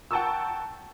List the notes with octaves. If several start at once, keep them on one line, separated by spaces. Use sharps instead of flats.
F#5 G5 A5 A#5 C#6 E6